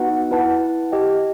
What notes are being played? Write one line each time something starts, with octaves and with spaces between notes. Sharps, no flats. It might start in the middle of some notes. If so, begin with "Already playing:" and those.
Already playing: B3 D#4 F#4 B4 F#5
E4 B4 F#5 A5
G4 D#5 G5